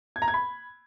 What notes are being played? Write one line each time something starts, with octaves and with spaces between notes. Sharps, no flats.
G#6
A#5
G#6
B5